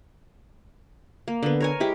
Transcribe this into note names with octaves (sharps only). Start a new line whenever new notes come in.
A#3
D3 B3
A#4 C#5 G#5
G#3 E4 G4